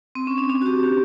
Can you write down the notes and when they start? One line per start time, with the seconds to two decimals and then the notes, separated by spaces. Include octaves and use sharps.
0.15 C4
0.27 C#4
0.38 D4
0.50 D4
0.62 F#4
0.66 G4
0.83 G4